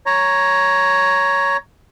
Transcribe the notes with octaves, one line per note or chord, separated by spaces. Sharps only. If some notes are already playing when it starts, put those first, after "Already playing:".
C#5 A#5